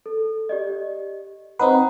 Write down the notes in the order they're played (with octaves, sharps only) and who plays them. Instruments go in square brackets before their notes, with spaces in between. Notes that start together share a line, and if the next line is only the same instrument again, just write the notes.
[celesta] A4
G4 D5 D#5
[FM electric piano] C4 D#4 B4 [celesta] F#5 A#5